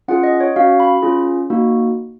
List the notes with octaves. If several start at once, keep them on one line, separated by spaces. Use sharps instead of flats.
C#4 F4 G#4 F#5
D#5
C#5
C#4 F#4 F5
B5
C#4 F4 G#4
A#3 D#4 F#4